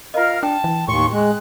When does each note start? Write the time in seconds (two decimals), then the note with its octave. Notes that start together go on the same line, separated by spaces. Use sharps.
0.14 F4 A#4 D#5 F5 F6
0.43 D4 G5 A5
0.64 E3
0.88 D#2 A2 C6 C#6
1.12 G#3 F#6